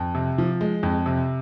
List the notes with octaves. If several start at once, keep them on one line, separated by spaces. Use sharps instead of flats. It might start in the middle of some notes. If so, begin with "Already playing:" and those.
Already playing: F2
C3
F3
G#3
F2
C3